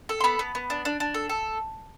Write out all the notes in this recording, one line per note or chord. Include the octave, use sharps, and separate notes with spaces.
A4
C6
B3 B5
B3
B3
D4
D4
D4
A4
A4